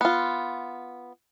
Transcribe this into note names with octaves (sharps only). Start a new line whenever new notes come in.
B3 F4